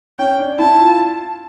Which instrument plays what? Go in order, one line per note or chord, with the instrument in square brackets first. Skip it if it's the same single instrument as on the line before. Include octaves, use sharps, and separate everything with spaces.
[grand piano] C#4 [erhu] G5
[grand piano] D4
[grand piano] E4 [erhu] A5
[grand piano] F4